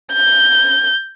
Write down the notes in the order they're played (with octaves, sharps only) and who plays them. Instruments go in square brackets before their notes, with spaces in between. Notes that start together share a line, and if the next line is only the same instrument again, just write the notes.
[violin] G6